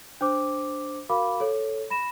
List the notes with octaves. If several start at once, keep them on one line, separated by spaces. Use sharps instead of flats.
D4 C5 D6
F#4 A#4 F5 B5 D6
A4 C#5
B5 A#6 E7